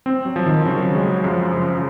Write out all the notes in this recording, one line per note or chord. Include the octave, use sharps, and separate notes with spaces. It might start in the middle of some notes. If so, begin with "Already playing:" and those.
C4
F#3
F3
D#3
C#3 F#3
G#3
F#2 F3
C#3